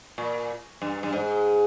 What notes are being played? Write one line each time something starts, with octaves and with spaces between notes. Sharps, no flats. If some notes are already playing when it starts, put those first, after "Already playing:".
A#2
G2
G2
G#2